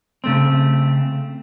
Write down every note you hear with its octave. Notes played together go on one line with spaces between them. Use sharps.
C#3 A3 C4